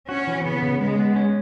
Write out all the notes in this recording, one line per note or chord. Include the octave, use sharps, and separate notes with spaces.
C#4 F#4
E3
C#3 B3
C#3
C#3 G#3
B3
C#4